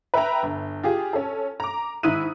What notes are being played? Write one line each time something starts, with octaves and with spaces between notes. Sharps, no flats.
B4 E5 G5 A#5
G1
F4 G4 G#4
C#4 A4
A#5 D6
G#2 D#3 E4 D#6 F#6 D#7